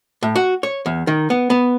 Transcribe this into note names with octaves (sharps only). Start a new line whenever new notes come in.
A2
F#4
C#5
E2
D#3
B3
B3